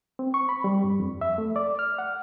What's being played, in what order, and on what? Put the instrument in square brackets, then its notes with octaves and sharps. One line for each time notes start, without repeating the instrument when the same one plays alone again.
[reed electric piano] C4
C#6
B5
G3
G2
F2
E5
A3
D5
F6
F#5